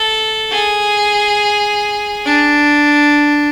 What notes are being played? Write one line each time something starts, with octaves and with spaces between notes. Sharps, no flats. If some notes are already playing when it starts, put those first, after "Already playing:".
Already playing: A4
G#4
D4